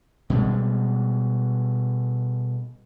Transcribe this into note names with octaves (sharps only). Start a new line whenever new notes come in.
B2 G3 G#3